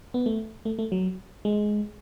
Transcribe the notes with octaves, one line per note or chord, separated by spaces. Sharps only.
B3
A3
A3
A3
F#3
G#3